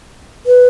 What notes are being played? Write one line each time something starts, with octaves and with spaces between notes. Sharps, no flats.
B4